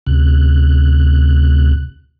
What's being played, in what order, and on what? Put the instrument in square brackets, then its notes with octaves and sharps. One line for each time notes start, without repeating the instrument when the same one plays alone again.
[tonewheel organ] D2 C3 F#6